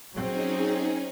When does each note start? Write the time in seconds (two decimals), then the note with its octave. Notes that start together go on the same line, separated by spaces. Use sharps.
0.13 F#3 C4 C#4 D#4 G#4